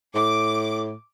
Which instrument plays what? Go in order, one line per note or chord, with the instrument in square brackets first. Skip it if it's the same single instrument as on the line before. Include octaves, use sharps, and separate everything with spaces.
[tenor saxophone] A2 [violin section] D6